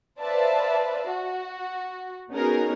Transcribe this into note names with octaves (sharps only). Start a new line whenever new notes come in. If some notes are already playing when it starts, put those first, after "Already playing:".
B4 C5 D5 E5 F5 A5
F#4
B3 C#4 D#4 F#4 G#4 A#4